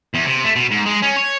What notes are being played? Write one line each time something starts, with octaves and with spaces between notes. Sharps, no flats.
E2
C3
A3
B2
G#2
G#3
C#4
C#5